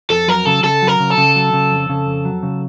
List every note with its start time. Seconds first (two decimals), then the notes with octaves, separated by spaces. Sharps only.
0.10 F2 A4
0.28 F#3 A#4
0.46 C#3 A4
0.64 C#3 A4
0.82 F#3
0.88 A#4
1.00 C#3
1.11 A4
1.18 C#3
1.36 F#3
1.53 C#3
1.71 F2
1.89 C#3
2.06 F2
2.25 F#3
2.43 C#3